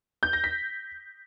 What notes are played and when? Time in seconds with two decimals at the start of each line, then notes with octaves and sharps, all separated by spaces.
0.23 G6
0.33 A#6
0.44 B6